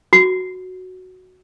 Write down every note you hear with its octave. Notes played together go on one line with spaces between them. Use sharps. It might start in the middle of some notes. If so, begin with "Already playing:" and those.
F#4